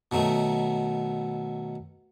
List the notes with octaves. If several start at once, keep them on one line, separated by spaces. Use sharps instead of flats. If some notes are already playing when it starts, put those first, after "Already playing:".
B2 D#3 F#3 A3